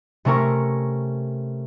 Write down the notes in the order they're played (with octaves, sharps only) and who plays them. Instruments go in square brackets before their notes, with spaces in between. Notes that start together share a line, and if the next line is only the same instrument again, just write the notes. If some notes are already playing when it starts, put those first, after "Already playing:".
[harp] C3 A3 C#4 A#4 C#6